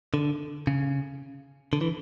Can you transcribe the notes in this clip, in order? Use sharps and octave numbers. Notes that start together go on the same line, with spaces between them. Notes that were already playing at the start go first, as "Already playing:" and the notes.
D3
C#3
D3
E3